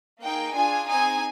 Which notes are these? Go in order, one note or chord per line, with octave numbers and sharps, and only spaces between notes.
A#3 D#4 G#4 G5
D4 F4 G#4 G#5
C4 D#4 G#4 G#5